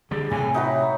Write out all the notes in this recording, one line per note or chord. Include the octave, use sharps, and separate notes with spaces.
D3 G3 G#4
A2 C3 G#5
D#4 F#4 B4 C#5 E5